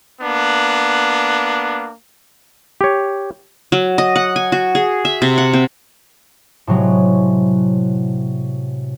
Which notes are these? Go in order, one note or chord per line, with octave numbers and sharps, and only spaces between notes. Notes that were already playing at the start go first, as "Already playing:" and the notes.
A#3 B3 D4
G4 C#5
F#3
D#5
F#5
G#5
F#4
G#4
E5
C3
F#5
C4
A2 C3 F#3 G#3